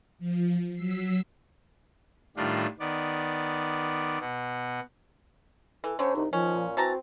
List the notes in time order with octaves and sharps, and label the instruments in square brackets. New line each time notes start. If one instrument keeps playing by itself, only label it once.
[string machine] F3
F#3 E6 B6 C7
[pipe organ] A2 D#3 G3 D4 F4
D#3 B3 D5
B2 B3
[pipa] E3 [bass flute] A4
[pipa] D3 F#3 [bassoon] C#4 [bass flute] C5
[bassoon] C2 [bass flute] D#4
[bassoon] D#3 [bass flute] F3 [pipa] C#4
[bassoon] A#2
[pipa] E3 A5 A#5 [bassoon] C4 [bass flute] F#4